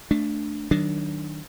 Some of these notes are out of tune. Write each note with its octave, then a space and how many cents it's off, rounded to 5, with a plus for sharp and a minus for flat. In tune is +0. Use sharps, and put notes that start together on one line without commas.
A3 +0 D4 +0
D#3 +0 F#3 +30 D4 +0